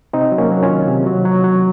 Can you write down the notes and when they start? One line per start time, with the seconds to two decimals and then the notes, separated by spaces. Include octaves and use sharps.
0.13 C3 C4 D#4
0.32 F#3
0.38 A#3 C#4
0.51 F#3
0.63 C#4 F4
0.70 D#3
0.88 C3
1.06 F#3
1.25 F#3
1.44 F#3